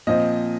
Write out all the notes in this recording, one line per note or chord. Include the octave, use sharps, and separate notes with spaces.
A#2 F3 C4 D#5